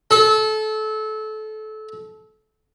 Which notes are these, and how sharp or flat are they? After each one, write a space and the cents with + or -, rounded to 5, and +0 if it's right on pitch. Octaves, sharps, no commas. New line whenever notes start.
A4 -25